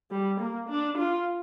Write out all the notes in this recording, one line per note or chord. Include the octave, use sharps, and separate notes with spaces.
G3
A#3
D4
F4